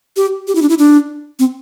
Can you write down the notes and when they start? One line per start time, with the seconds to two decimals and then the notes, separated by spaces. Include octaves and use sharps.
0.17 G4
0.47 G4
0.55 E4
0.62 D4
0.69 E4
0.78 D4
1.39 C4